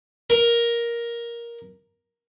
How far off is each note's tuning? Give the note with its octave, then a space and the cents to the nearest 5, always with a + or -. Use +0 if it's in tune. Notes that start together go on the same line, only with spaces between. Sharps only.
A#4 +10